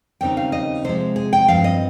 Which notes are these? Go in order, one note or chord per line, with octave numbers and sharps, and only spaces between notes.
D#2 C#3 G3 C4 D#4 G5
F5
D#5
C3 F3 G#3 C5
G#4
G5
G2 F3 C4 F5
D#5